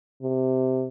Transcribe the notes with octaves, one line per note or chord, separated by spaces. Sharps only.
C3